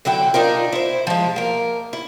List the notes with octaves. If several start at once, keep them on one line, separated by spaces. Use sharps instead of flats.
D3 F#3 E4 G5
D4 D#4 F4 A#4
E4 C5
F3 G#3
A#3 A#4
E4